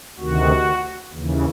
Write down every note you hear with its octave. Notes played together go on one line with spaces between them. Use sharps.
D2 C3 D#3 F#4
D#2 C#3 E3